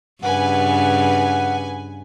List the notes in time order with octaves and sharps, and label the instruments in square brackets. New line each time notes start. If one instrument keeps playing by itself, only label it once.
[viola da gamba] G2 C#3 [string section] B4 G#5 [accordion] F#5